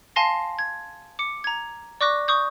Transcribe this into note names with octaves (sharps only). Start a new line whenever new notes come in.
F5 G#5 A5 C6 A#6 C7
G#6
D6 C#7
A#5 G#6
D5 C#6 D6 F#6 A#6
C#6 D#6 G6